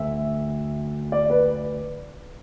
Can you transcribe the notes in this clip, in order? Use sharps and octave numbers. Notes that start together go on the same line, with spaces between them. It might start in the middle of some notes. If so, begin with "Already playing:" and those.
Already playing: D2 D3 E5
D5
B4